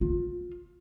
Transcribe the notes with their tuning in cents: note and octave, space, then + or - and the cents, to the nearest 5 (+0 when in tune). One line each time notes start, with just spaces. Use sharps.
F4 +25